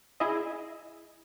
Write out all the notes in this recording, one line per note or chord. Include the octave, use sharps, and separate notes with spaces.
E4 G#4 D#5